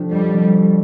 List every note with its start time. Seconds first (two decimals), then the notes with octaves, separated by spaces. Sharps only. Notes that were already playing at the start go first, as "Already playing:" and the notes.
Already playing: C3 F3 A3 D4 G4
0.11 F2 G3
0.32 C3 F3 A3
0.54 C3